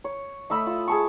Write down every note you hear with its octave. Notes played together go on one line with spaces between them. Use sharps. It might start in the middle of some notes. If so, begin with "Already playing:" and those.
C#5
A3 D#5 E5 B5
F4
G#4 A5 C#6